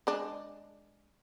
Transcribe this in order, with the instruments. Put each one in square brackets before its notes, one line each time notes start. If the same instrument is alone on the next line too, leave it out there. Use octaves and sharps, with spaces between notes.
[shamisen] G#3 D4